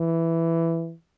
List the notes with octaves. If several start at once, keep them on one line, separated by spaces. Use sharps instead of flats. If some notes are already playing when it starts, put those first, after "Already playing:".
Already playing: E3